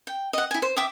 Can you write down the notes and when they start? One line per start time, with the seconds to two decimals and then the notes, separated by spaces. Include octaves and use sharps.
0.07 G5
0.33 D#5 F#5
0.51 E4 G#5
0.62 C5
0.76 E5 G5 D6 D#6